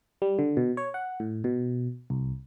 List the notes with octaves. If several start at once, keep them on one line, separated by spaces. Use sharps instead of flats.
G3
D3
B2
C#5
F#5
A2
B2
C2